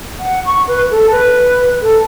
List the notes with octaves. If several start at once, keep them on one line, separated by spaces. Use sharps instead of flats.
F#5
C#6
B4
A4
B4
A4